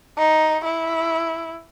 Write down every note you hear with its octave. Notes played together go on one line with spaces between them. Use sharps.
D#4
E4